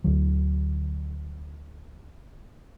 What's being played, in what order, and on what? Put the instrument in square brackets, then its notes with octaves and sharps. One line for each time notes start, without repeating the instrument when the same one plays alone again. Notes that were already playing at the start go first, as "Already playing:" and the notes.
[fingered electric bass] D2 D3 F#3